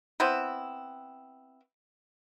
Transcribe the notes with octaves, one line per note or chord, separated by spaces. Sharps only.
B3 C4 E4